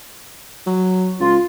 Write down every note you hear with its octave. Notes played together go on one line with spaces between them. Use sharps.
F#3
C#2 F4